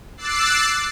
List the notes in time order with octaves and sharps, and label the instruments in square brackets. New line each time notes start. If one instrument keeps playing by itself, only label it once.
[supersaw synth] D6 E6 F#6 A6 C7